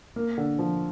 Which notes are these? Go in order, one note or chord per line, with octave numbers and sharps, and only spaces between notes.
A#3
D3
F3